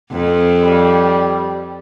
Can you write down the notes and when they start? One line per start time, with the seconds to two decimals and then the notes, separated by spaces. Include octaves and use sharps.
0.11 F2
0.64 G3